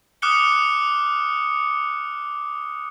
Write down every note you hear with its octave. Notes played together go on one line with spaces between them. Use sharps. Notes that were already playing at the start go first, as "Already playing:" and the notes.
D6 D#6 F6 F#6 C#7 G7